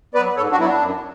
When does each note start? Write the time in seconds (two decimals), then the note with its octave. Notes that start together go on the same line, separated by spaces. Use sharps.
0.14 B3 B4 D5
0.18 F#3
0.36 G#2 A4 C#5
0.51 D4 F#4
0.59 F#3 B3 E4
0.66 D4
0.81 F#2